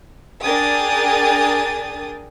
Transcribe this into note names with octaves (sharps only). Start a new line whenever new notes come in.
D4 G#4 A#4 G5 D#6 A6